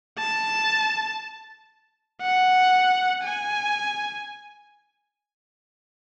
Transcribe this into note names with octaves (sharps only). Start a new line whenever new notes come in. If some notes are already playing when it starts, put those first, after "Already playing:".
A5
F#5
G#5